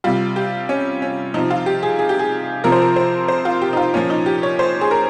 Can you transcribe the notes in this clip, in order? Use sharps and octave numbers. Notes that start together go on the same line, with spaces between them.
C3 G3 F4
G4
C#4
C#4
C3 F3 D#4
F4
G4
G#4
G#4
G4
G#4
C3 F3 A#4
C5
A#4
C5
C5
F4
G4
D#4
F4
A#2 F3 C#4
D#4
G4
C#5
C5
G#4
A#4